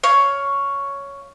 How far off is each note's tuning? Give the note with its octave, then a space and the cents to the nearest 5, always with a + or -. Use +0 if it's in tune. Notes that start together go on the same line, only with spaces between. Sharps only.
C#5 +5 F5 +0